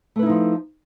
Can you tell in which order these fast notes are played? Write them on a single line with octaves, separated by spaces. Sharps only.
A3 B4 E4 D#4 F3